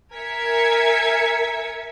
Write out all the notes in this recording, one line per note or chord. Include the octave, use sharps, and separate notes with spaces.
A#4 E5 G#5 G#6 B6 C#7